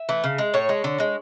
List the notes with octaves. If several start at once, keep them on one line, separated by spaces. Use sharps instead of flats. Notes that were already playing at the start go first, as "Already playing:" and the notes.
Already playing: E5
E3 A3
C#3
G#3
A2 C#5
G#3
D3
G#3